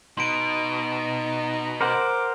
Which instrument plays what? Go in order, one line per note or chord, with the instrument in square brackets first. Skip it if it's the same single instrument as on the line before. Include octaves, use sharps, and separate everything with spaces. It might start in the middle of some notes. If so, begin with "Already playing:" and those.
[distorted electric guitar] B2 [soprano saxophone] D#4 [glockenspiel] C6 D7
[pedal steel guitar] A#4 C5 F#5 [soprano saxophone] D6